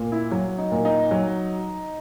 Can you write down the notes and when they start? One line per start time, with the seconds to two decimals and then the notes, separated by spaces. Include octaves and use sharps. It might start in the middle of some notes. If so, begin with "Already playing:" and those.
Already playing: A#2
0.12 E4
0.31 F#3
0.58 D#4
0.71 A#2
0.85 D#4
1.11 F#3